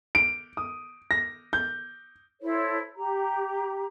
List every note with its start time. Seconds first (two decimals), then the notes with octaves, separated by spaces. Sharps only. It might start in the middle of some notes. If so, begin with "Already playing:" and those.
0.15 D7
0.57 D#6
1.11 A#6
1.53 G6
2.41 E4 A4 C5 C#5
2.96 G4 A#5